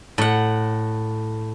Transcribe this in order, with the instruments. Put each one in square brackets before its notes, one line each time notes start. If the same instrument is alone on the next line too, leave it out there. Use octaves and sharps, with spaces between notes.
[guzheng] A2 F#5